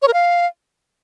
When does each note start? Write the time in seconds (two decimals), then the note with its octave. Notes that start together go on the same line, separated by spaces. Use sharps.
0.02 C#5
0.08 A#4
0.13 F5